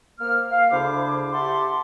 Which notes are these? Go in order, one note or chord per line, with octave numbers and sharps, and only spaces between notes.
A#3 C5 F6
F5
D2 C#3 D4 E4 C5 D6
E4 G4 F#5 A5 C6 D6